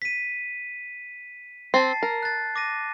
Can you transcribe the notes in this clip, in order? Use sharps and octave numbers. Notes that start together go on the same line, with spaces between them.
B6 D#7
C4 A5 A6 C7
A#4
F#6 A6
D6 A#6 D#7